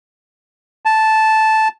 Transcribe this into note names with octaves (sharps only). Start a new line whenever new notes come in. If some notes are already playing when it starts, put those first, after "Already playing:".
A5